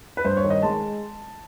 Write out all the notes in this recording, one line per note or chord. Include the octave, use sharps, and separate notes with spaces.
B4
G2 C5
C#5
D#3
D#5
G#3 A5